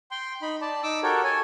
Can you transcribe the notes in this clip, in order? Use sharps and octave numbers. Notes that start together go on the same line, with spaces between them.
G5 C6
D#4 B5
D5 A5
D#4 D6 E6
F#4 G4 A4 A#4 C#5
A4 C#5 G#5